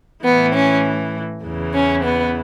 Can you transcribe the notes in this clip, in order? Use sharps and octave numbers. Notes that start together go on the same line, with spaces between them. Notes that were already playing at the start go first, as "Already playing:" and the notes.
A2 E3 B3
C#4
E2 C#3 E3
C#4
B3